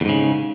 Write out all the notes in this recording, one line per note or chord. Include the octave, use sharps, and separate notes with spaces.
E2 G#2 C#3